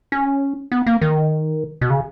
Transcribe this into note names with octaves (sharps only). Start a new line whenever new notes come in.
C#4
B3
A#3
D#3
B2
C#3